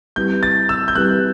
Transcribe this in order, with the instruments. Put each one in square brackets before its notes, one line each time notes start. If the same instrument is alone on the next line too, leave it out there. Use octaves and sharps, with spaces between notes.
[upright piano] G3 C4 E4 G4 B4 [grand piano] G6
[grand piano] A6
E6
G6
[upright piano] G3 C4 E4 G4 B4 [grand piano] F#6